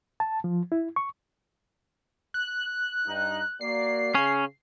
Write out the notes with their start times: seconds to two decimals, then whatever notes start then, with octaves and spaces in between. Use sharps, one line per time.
0.20 A5
0.44 F3
0.72 E4
0.96 C#6
2.34 F#6
3.07 G2 D#4 A#5
3.61 A#3 F#4 D5 C7
4.15 C#3 C#4